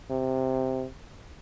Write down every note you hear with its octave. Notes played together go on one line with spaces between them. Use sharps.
C3